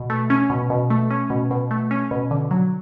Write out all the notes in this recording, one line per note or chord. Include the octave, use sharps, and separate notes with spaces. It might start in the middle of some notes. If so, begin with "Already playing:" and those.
Already playing: B2
A3
C#4
B2
B2
A3
C#4
B2
B2
A3
C#4
B2
D3
F#3